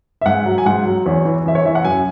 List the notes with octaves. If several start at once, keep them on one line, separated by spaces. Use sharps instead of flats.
E5
G#2 F#5
F#3
G#5
G#2 F#5
F#3
E2 C#5
E3
E2 E5
C#5
E3 E5
F#5
F#2 G#5